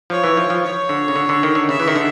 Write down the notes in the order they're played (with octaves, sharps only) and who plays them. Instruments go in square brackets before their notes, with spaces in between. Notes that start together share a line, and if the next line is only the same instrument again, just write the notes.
[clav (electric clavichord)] F3 [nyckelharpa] C#5
[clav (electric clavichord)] E3
F3
F3
[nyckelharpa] C#5
[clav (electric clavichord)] D3
C#3
D3
D3
D#3
D3
[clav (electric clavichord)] C#3 [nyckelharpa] E5
[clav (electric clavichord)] E3
D#3
D3